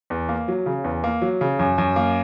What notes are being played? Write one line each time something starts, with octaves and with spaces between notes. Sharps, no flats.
E2
A#3
F#3
C#3
E2
A#3
F#3
C#3
F#2
F#2
A#3